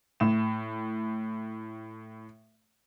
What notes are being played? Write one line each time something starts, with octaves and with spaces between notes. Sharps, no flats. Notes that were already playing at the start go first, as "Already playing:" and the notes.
A2 E7